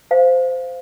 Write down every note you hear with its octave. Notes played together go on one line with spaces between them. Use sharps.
C5 F5